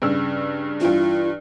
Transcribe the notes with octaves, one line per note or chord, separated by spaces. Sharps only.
G2 C#3 E6
G2 E3 F4